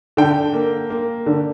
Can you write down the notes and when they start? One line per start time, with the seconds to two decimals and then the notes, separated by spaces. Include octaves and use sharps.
0.17 D3 G5
0.53 A#3
0.90 A#3
1.26 D3